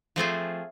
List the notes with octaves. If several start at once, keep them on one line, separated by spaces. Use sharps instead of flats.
F3 A3 C4 F4 G#4